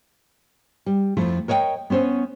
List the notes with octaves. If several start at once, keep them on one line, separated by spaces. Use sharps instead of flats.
G3
F2 F3 A3 E4 F4
A#4 C#5 D#5 F5 G5
B3 C#4 C5 C#5